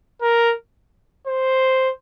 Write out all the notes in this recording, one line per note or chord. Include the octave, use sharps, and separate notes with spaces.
A#4
C5